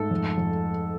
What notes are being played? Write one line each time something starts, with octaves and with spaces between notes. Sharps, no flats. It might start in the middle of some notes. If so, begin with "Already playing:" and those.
Already playing: G#2 A3 A4
F2
F2